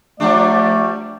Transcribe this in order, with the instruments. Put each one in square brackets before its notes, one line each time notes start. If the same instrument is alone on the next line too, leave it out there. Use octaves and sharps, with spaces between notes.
[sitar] F3 G3 D4 [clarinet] A3 [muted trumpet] D5